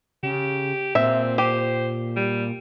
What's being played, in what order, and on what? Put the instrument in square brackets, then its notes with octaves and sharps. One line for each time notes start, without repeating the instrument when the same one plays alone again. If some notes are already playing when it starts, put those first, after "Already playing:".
[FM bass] C#3 [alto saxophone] G4
[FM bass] A#2 [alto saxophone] C4 [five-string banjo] E5
[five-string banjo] G4 [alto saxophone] C5
[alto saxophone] G3